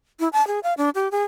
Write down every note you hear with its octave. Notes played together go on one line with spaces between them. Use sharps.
E4
A5
G#4
F5
D4
G4
G#4